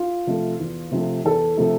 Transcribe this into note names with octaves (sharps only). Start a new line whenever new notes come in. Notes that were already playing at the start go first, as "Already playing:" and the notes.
Already playing: F4
C3 F3 A3
E2
C3 F3 A3
E2 A4
C3 F3 A3